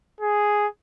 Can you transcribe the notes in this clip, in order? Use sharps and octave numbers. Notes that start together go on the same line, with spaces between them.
G#4